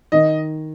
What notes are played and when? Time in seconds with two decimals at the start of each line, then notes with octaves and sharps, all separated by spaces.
0.12 D#3 D#5